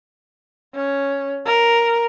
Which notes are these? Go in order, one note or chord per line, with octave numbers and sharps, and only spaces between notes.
C#4
A#4